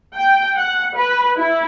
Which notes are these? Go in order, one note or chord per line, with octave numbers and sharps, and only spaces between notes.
G5
F#5
B4
E4